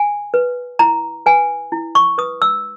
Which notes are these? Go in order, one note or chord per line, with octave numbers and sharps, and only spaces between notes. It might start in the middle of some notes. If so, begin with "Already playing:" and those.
Already playing: G#5
B4
E4 A#5
B4 G#5
E4
C#6
B4 D#6
E6